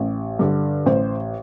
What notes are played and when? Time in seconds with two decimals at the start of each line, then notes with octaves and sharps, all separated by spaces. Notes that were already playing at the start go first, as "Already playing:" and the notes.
Already playing: A1
0.39 G2 D3
0.86 A1 C5